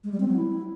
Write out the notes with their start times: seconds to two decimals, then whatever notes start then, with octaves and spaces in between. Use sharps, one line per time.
0.04 G#3
0.12 G3
0.20 C4
0.28 F#3
0.36 E4